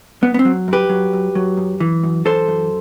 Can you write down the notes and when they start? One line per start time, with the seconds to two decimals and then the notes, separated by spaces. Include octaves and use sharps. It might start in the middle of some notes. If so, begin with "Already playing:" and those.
0.22 F#2 B3
0.34 B3
0.39 C4
0.45 F#3
0.68 F#2 G4 B4
0.89 F#3
1.13 F#2
1.35 F#3
1.57 F#2
1.80 E3
2.03 F#2
2.25 E3 A4 C5
2.48 F#2